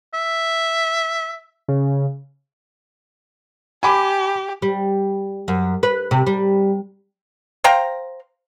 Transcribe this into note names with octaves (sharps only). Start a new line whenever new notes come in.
E5
C#3
G4 G#5 B5 D6
G3
F#2
B4
C3
G3
C5 F5 G5 A#5